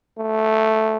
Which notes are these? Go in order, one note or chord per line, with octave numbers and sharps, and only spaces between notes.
A3